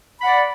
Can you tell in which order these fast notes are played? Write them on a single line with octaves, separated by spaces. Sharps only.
B5 F#5 D5